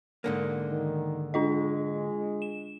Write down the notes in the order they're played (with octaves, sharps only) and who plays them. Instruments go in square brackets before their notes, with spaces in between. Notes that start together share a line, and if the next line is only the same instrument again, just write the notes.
[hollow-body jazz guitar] G#2 D3 A#3
[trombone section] D#3
[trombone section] G#3 [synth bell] D4 F4 D#5
[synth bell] E7